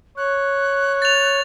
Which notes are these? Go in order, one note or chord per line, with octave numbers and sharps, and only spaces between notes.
C#5 F#6
A6 F7